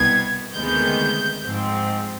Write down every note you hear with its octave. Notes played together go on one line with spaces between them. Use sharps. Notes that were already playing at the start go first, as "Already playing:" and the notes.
Already playing: C2 B2 B3 G#6
D2 C3 D#3 G#3 B3 G6
G#2 F3 C4